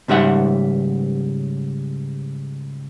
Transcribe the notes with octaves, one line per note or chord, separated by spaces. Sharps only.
C#2 G#2 G3 E5 F#5